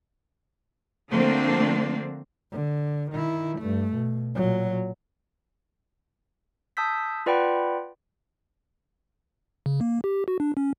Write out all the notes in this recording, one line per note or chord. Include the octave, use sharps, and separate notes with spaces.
D3 F3 A3 A#3 C4 D4
D3
D#3 E4
G2 A3
B2
A#2 F#3
A5 D#6 E6 G6 B6
F4 B4 D5 F#5 G5 B5
C#3
A#3
G4
F#4
D4
C#4